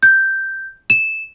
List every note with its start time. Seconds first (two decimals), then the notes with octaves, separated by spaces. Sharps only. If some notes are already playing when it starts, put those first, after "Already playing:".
0.03 G6
0.90 E7